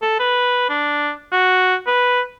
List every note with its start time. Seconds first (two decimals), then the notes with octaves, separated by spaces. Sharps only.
0.02 A4
0.20 B4
0.69 D4
1.32 F#4
1.87 B4